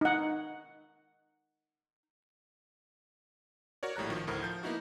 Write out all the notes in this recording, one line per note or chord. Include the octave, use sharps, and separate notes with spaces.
D#4 F#5
F#4 A#4 C#5 D5
A#1 A2 G3 A#5 F#6
D#3 F3 F#4
D2 A2 A#4 C5 F6
F3 G6
A#3 B3 D#4 E4 F#4